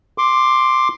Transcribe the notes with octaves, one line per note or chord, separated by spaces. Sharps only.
C6 D6